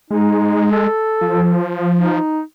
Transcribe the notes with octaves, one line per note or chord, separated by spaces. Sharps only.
G#3 D#4
A4
F3
D#4